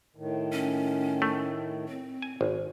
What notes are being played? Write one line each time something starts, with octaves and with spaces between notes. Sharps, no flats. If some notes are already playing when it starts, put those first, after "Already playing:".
A2 D#3
C#4
A3
C4
G#5
G#1